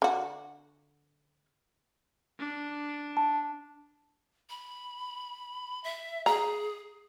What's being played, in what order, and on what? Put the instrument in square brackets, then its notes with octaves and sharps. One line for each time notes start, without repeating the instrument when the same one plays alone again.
[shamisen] D3 F#4
[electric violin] D4
[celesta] A5
[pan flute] B5
E5
[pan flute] G#4 [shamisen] A#5